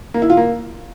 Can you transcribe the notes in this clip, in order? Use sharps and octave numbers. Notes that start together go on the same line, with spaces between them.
A#3
E4
F4
A#3